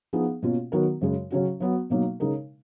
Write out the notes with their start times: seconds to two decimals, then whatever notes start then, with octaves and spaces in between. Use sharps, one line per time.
0.13 F3 B3 D#4 G#4
0.42 B2 A#3 C#4 F4
0.72 D#3 F#3 B3 F#4 A#4
1.01 F#2 C#3 G#3
1.30 C#3 F#3 C#4 F#4
1.60 F#3 B3 F#4
1.90 B2 F#3 A#3 D#4
2.20 C#3 G#3 D#4 A#4